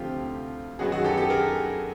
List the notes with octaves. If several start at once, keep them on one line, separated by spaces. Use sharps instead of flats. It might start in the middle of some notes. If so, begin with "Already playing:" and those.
Already playing: D2 C3 F3 A3 C4 F4 G4
F#2 D#3 F#3 B3 F#4 G#4
F#4 G#4
G4 A4
G4 A4
G#4 A#4